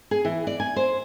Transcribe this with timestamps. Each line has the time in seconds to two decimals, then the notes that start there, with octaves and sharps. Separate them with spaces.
0.11 G#4
0.25 E3
0.47 D5
0.60 G#5
0.76 C5